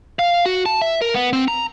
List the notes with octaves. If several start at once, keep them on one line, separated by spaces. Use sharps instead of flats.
F5
F#4
A5
E5
A#4
B3
C4
A#5